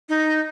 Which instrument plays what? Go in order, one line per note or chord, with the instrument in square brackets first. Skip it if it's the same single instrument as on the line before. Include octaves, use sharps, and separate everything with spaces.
[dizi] D#4